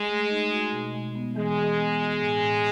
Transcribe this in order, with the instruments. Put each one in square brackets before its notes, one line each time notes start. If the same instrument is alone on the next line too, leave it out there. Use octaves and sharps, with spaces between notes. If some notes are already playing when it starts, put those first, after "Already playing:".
Already playing: [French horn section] G#3
[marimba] A3
D#4
F#4
B2
G#3
B3
[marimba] E3 [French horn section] G#3
[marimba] E3
B3
F#4
A2
A2